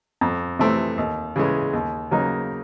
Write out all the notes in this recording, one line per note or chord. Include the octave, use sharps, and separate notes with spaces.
F2
C3 E3 A3 C4
D#2
C#3 E3 G#3
D#2
C#3 F#3 A#3 D#4